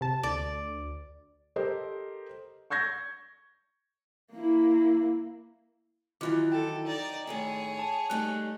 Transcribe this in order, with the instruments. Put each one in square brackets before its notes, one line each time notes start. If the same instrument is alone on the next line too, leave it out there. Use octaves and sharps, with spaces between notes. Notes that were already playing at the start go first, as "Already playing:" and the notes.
[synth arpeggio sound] C3 A5
[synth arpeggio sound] D2 [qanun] D5
[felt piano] G4 A4 A#4 C5 D#5
C#6 G6 G#6 A#6
[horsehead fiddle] A#3 E4
[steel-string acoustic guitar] D#3 E3 F#3 [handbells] E4 F4 D6
[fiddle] A4 [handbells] G5
[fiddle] D#4 D5
[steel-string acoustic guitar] A2 D#3 A4 [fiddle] G#4 C#5
[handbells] A5
[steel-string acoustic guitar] G3 A3 D#4 [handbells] F#6